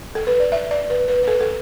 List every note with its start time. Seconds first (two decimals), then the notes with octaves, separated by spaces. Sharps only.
0.15 A4
0.27 B4
0.40 D5
0.52 E5
0.71 D5
0.90 B4
1.08 B4
1.23 B4
1.28 A4
1.41 A4